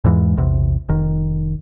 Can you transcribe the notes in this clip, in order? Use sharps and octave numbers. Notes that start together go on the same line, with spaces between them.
E2 G#2 E3 G#3
A#1 E2 C3
F1 D#3